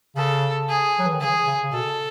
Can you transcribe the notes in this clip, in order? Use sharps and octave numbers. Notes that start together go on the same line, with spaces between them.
C#3 A4
G#4
F#3
E3
D#3
C#3 G#4
C#3
C#3
B2 A4